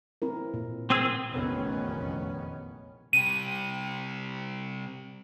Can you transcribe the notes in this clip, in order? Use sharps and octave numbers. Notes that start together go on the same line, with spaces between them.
C4 E4 A#4
A#2
C4 G#4 E6
F1 A#1 E2 D#3 B3 C#4
C3 G3 D#7